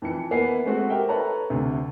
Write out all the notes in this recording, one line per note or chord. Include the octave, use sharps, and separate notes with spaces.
F2 E3 C#7
A#3 B3 E5 G#5 C7
G#3 A3 C4 F#4
G4 A#4 E5 G5
A4 B4 C#5 A5 A#5
D2 C3